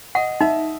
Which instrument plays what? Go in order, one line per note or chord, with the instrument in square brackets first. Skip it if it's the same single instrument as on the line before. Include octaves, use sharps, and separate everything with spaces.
[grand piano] D#5 [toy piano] F#5
[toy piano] D#4 [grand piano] E5